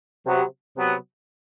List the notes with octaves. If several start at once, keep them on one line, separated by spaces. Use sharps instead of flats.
C3 F#3 B3
C3 F#3 B3